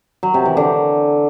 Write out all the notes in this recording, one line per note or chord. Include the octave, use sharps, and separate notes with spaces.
F#3
C3
E3
D3